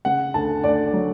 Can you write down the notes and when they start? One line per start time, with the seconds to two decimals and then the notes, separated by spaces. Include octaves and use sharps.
0.05 C#3 F#5
0.34 D2 A5
0.64 D2 D5
0.93 F#3